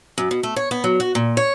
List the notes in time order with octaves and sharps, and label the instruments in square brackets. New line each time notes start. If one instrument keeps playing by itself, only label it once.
[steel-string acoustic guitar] F#2
B2
A3
C#5
B3
F#3
F#4
A#2
C#5